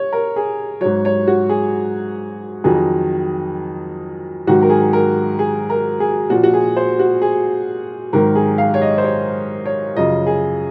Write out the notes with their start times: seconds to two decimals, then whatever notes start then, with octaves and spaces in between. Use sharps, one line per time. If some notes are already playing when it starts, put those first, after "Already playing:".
Already playing: C#5
0.13 A#4
0.36 G#4
0.81 G#2 F#3 C#5
1.05 C#5
1.28 F#4
1.49 G#4
2.64 F2 D#3 F#3 G#4
4.47 G#2 D#3 F#3 F#4
4.62 A#4
4.70 G#4
4.93 A#4
5.39 G#4
5.70 A#4
6.00 G#4
6.30 A#2 F3 F#4
6.43 F#4
6.54 G#4
6.76 C5
6.99 F#4
7.22 G#4
8.13 G#2 D#3 F#3 A#4
8.35 G#4
8.58 F5
8.74 C#5
8.82 D#5
8.98 C5
9.04 C#5
9.66 C#5
9.96 F#2 C#3 F3 D#5
10.27 G#4